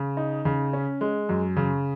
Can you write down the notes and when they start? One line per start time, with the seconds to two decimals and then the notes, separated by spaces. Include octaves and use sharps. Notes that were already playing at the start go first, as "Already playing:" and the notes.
Already playing: C#3
0.17 D#4
0.45 C#3
0.73 C#4
1.01 G#3
1.29 F#2
1.56 C#3